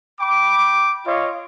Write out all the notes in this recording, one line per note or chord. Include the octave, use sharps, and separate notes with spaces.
G5 B5 D6
F4 C#5 D#5 F5